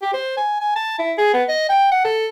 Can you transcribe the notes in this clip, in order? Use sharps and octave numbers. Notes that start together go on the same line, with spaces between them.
G4
C5
G#5
G#5
A5
E4
G#4
B3
D#5
G5
F#5
A4